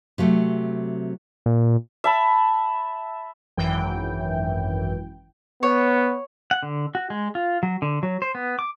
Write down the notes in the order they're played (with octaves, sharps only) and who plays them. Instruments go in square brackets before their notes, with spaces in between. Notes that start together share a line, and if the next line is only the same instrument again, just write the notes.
[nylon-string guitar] C3 F#3 A3
[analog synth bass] A#2
[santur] E5 A5 B5
[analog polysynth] G#1 F#2 E3 G5
[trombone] B3 [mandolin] C#5
[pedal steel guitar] F#5
D3
F#4
G#3
F4
F#3
D3
F#3
C5
B3
D6